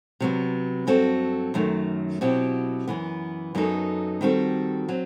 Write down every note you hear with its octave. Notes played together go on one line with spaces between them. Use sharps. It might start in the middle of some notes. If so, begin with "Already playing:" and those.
C3 F#3 B3
G2 F#3 C4 F#4 A4
F#2 D#3 F#3 A3
B2 F#3 C4 E4 G4
F#2 E3 B3
F#2 F#3 B3 D#4 A4
D#3 G3 C4 F#4 A4
F#3 C4